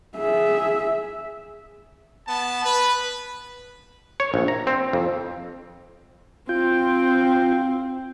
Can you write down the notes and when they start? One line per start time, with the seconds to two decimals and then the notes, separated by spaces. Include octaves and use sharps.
0.17 G#4 E5
2.28 B3 A5
2.65 B4
4.20 C#5
4.34 A#1
4.48 A#5
4.67 C4
4.93 F2
6.49 C4 F4 G5